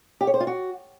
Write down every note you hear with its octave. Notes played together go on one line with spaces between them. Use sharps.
G4
C#5
C5
F4
F#4